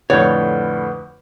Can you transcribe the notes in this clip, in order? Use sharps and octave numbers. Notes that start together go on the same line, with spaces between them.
F2 A2 D3 B4 C#5 D5 F#5 G6